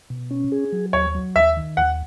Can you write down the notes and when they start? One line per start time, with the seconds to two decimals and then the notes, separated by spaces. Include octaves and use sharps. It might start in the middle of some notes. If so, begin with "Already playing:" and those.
0.10 B2
0.31 C#4
0.52 G#4
0.73 F#3
0.93 D#2 C#5
1.15 F#3
1.35 D#2 E5
1.57 D#3
1.77 D#2 F#5